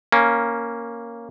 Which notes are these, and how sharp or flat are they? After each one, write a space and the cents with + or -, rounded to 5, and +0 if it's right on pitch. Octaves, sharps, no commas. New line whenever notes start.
A#3 +0 C#4 +0